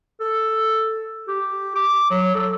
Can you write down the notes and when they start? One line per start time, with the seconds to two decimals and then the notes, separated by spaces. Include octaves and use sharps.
0.20 A4
1.28 G4
1.75 D6
2.10 F#3
2.35 A4